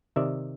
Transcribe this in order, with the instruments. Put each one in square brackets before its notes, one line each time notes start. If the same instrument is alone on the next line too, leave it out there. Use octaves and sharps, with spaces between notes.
[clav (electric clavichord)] C3 D#3 D5 E5